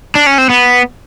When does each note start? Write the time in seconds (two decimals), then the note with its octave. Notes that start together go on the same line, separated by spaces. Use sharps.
0.15 D4
0.26 C#4
0.38 C4
0.50 B3